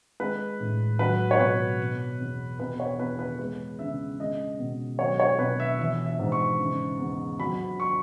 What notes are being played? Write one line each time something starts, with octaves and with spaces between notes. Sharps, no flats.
G#3 B4
A2
F#3 B4
C#5
B2 B4
B2
E2
B2 B4
C#5
E2 B4
B4
G#3 B4
C#3 E5
G#3 D#5
B2
F#3 C#5
C#5
B2 B4
E5
E3 E5
E5
G#2
C#6
C#3
E2
F#3 B5
C#6